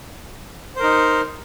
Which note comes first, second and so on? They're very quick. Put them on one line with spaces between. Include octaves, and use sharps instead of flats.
C5 A#4 D#4